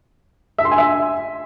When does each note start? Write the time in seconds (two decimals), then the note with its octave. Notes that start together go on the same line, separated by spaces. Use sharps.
0.58 E5
0.65 C6
0.71 G#5
0.78 E5